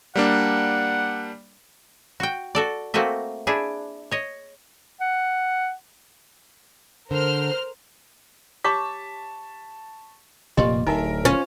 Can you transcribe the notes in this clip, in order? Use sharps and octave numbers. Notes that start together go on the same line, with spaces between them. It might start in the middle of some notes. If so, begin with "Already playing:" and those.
G3 A#3 D4 F#5
F#4 G5
F#4 A4 D5
A3 A#3 C4 F#4 D#5 E5
D4 E4 G#4
C#5 D#5
F#5
D3 A#4 C5 F6
G4 C#5 A5 C#6 D6 B6
F1 A#2 A#3 G4 D#5 C6
D1 D#4 A#4 E5 G#5
C#4 F4